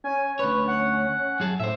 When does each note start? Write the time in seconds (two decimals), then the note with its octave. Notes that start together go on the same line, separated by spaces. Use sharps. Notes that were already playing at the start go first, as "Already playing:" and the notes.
0.04 C#4 G#5
0.39 D2 B4 C#5
0.68 F#5
1.40 F#2 G#4 A5
1.60 A2 C5 E5